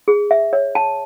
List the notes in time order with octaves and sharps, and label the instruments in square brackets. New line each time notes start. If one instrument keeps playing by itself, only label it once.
[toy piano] G#4
E5
C#5
A5